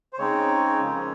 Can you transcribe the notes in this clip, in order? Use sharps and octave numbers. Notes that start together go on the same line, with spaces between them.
C5
C#3 G#3 C4 D#4 C#5
F2 C#3 F3 A#3 C#4